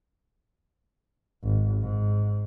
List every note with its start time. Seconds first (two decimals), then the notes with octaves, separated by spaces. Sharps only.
1.44 G#1
1.82 G#2